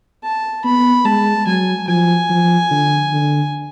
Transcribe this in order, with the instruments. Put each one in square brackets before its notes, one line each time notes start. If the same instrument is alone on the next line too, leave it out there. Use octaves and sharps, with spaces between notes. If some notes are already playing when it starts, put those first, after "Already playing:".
[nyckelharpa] A5
[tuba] B3 [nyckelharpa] B5
[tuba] G#3 [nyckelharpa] A5
[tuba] F#3 [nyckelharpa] G#5
[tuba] F3 [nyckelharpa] G#5
[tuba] F3
D3
D3